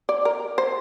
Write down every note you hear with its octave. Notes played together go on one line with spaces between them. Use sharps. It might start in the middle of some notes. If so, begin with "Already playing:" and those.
D5
A#4
C5